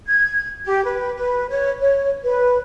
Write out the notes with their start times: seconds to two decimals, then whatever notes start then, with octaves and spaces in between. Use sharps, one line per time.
0.07 G#6
0.66 G4
0.84 B4
1.17 B4
1.50 C#5
1.80 C#5
2.24 B4